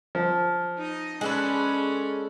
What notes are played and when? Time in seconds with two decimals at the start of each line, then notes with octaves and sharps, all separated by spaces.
0.15 F3
0.78 D#4 D#5
1.21 G#3 C#4 A4 B4 D5